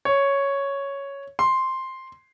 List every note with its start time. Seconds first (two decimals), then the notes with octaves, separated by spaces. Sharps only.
0.05 C#5
1.39 C6